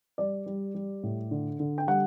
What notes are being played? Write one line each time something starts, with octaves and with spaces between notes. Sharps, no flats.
G3 D5
G3
G3
A2
D3
D3
G5
G3 F#5